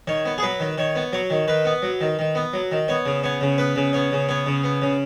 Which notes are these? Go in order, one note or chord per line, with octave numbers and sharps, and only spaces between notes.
D#3 C#5
B3
G#4
F#3 B4
D#3
D#3 C#5
B3
F#3 C#5
D#3
D#3 B4
B3
F#3
D#3
D#3
B3
F#3
D#3
B3 C#5
C#3
B3 C#5
C#3
B3 B4
C#3
B3 C#5
C#3
B3 C#5
C#3
B3
C#3